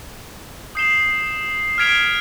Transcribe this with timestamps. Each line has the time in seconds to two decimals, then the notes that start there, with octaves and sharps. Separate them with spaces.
0.75 D#6 G6 C7 E7 G7
1.78 F6 G#6 B6 D7 F7